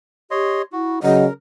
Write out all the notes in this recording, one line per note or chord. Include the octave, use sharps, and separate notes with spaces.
G4 C#5 D#5 C6
E4 F#4
C#3 F#3 A#4 D#5 F#5